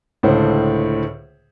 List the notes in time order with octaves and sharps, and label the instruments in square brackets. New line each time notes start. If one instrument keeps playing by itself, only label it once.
[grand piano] C#2 A2 D3 C5